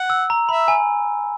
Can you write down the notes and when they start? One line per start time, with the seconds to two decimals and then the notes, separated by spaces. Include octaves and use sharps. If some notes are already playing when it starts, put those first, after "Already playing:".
Already playing: F#5
0.10 E6
0.30 A#5
0.49 E5 B5
0.68 G#5